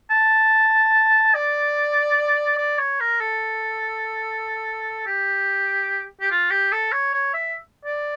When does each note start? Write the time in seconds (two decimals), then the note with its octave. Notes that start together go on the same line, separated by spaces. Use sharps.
0.10 A5
1.35 D5
2.58 D5
2.79 C#5
3.00 A#4
3.21 A4
5.07 G4
6.21 G4
6.31 F4
6.51 G4
6.72 A4
6.92 C#5
7.14 C#5
7.34 E5
7.85 D5